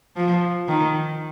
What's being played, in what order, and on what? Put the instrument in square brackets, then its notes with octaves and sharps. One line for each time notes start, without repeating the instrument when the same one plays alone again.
[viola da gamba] F3
D#3